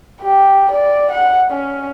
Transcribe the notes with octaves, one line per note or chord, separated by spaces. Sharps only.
G4
D5
F#5
C#4